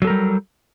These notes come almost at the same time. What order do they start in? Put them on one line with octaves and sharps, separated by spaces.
F#3 A4 A#4 G3